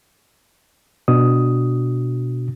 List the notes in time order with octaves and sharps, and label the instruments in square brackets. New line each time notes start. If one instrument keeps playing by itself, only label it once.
[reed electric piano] B2 D4 F#4 D#6